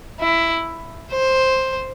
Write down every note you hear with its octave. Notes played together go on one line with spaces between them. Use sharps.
E4
C5